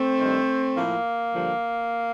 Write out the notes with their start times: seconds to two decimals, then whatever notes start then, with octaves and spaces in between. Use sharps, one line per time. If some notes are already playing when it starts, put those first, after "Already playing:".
Already playing: A3 C4
0.17 G2 D#3
0.75 A2 F3 A#3
1.33 G2 D3 F3